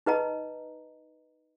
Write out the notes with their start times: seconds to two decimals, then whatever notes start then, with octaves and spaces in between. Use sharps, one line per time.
0.06 D#4 B4 D#5 A#5